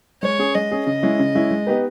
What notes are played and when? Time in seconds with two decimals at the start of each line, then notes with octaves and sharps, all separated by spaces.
0.23 G#3 C#5
0.39 C#4 G#4
0.55 G#3 D#5
0.71 C#4 G#4
0.87 C#3 D#5
1.03 G#3 C#4 E4
1.20 C#3
1.35 G#3 C#4 E4
1.51 G#3
1.67 B3 D#4 G4 B4